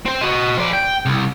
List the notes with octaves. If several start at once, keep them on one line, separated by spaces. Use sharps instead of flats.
C4 C5
F#4 D#5
F3 D5
G5
C2